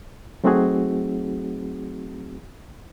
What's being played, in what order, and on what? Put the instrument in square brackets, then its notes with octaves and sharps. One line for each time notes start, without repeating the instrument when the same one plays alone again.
[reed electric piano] F#3 A3 C4 D#4 F#4 G#4